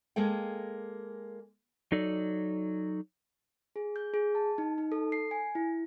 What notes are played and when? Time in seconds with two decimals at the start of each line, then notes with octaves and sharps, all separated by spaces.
0.16 G#3 A#3 G#4 A4 G5
1.92 F#3 D#4 A4 D5
3.76 G#4
3.96 G6
4.14 G#4
4.35 A5
4.58 D#4
4.78 D#4
4.92 A4
5.12 C7
5.31 G#5
5.55 E4